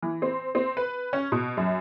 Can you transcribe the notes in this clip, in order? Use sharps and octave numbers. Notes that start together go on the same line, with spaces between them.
E3
C4
C4
B4
C#4
B2
F#2